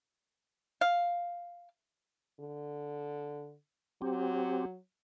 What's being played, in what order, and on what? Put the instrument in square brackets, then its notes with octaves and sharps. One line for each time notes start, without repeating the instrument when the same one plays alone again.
[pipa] F5
[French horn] D3
[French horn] F#3 [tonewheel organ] C4 G4